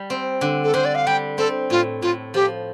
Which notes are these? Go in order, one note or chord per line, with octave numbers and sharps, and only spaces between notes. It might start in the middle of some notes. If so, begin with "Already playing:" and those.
Already playing: G3
C4
D3
A4
D3 C5
D5
F5
G3 G5
C4 A4
A2 F4
A2 F4
F3 G4